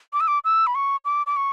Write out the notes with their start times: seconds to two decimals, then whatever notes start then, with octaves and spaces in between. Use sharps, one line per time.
0.13 D6
0.21 E6
0.28 D6
0.45 E6
0.67 B5
0.75 C#6
1.05 D6
1.27 D6
1.37 C#6